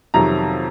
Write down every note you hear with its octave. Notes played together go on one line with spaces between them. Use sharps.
F2 C3 D#3 F#3 A#5